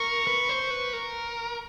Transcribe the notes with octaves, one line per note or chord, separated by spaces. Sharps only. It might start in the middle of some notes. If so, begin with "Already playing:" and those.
Already playing: A#4 C#6
B4
C5
B4
A#4